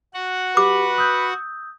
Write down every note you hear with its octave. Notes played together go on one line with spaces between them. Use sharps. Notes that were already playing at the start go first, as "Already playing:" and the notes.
F#4 F#5
G4 B4 D6
D#6 E6 G6